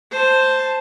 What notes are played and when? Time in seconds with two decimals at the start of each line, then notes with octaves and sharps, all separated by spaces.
0.12 C5 A5